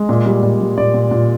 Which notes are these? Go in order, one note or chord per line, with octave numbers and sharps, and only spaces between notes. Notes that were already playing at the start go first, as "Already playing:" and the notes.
Already playing: G#3
A#2
G3
A#2
G3
A#2 D5
A#2
A#2